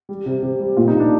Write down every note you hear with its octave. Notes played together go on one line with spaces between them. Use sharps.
G3
C3
C3
G3
A#2 F4
D#4
A#2
D4